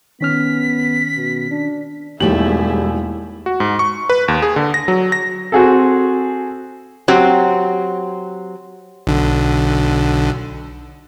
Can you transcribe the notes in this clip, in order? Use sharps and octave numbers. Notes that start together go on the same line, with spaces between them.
D#3 B3 C#4 F6 B6
B2
D4
E1 D#2 G3 A3 E4 G4 G#4 F#7
F#4
G#2
C#6
B4
D#2
G#4
D3
A#6
F#3
A#6
C4 F#4 G#4 A4
F#3 C4 G4
B1 D3